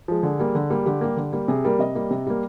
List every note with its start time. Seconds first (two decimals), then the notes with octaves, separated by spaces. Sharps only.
0.08 F3 G#3
0.23 D3 G#4
0.39 G3 A#3
0.55 D3
0.70 G3 A#3
0.86 D3 G4
1.01 G3 A#3
1.17 D3
1.33 G3 A#3
1.48 C3 G#4
1.65 G3 A#3 A#4
1.79 C3 D#5
1.95 G3 A#3
2.10 C3
2.26 G3 A#3